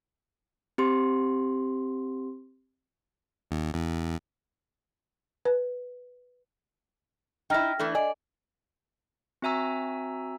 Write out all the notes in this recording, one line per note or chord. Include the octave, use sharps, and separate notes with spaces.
C4 G4 C6
D#2
E2
B4
D#4 E4 G5 F6 A#6
E3 A3 D4
D5 D#5 G#5
C4 F#4 E5 G#5 A#5 E6